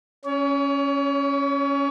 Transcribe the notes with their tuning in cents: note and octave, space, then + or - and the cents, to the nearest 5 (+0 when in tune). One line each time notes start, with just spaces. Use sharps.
C#4 +0 C#5 +35